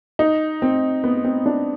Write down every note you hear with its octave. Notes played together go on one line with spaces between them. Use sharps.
D#4
C4
B3
C4
D4